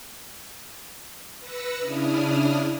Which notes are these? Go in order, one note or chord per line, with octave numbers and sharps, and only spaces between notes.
B4 E6 A#6 C#7
C#3 D4 E4 D#6 F6